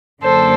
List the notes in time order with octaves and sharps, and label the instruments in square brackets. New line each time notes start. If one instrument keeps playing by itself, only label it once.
[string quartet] F#2 D3 F#3 A#3 D4 A4 C5